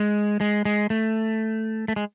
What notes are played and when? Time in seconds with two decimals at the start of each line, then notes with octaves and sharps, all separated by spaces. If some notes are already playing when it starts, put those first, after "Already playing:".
Already playing: G#3
0.41 G#3
0.65 G#3
0.90 A3
1.88 A3
1.96 G#3